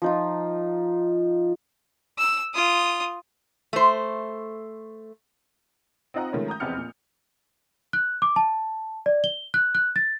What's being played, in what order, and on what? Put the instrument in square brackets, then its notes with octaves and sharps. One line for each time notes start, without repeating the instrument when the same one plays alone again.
[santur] F3 D#4 F4
[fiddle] E6
F4 D#6
[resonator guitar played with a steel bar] A3 C5
[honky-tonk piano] C4 D#4 F4 D#5 F#5 A#5
D#3 F3 G#3 A3 B3 C#4
A#5 D#6 G6
F1 E2 B3 C4 F6 C#7
A#2
[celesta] F#6
D6
A5
D5
G7
F#6
F#6
A6